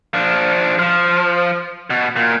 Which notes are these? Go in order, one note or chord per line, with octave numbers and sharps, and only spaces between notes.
F3 D4
F3
B2
A#2